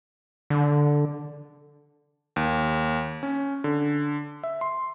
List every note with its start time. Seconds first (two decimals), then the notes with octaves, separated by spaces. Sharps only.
0.50 D3
2.36 D#2
3.23 C#4
3.64 D3
4.43 E5
4.61 C6